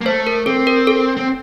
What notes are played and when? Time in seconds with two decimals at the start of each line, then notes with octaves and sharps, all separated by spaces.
0.01 A#3
0.06 A3 C5
0.27 A#4
0.46 C4 A4
0.67 A#4
0.87 A4
1.17 C4